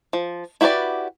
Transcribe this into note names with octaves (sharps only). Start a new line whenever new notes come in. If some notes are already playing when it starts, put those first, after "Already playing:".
F3
E4 F#4 G4 B4 D5